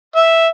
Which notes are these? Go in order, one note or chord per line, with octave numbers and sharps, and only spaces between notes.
E5